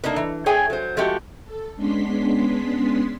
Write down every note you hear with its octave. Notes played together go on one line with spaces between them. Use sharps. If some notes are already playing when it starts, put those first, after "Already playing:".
A3 A#3 D4 D#4 B4
E3
A3 G#4 C#5 G5 G#5
F#3 C5
F3 G#3 A3 F#4 G4
A4
G#3 B3 C#4 D4 C6 B6